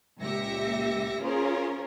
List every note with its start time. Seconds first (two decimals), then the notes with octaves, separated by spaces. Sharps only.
0.21 C#2 A#2 G4 E5 A#6 C#7
1.22 C#4 F4 G#4 A#4 C5 C#5